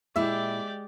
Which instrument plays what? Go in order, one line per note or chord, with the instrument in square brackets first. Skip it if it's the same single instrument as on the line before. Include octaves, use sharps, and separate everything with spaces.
[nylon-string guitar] A#2 E4 [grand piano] G#3 [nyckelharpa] G4 D5 [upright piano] E5